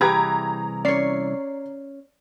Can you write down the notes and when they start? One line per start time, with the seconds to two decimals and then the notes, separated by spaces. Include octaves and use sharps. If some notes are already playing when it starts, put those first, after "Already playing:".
0.01 C2 E3 G4 G#4 B4 A#5 G#6
0.85 C#4 C#5 D5 C7